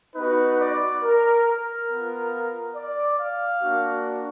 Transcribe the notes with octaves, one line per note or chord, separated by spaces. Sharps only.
B3 D#4 F#4 B4
D5
A#4
A#4
B3 F4
D5
F5
A#3 D4 F#4